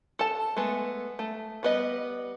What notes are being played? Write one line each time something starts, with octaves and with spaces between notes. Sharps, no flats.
A4 A5
G#3 A3 B3
A3
G3 B3 D#5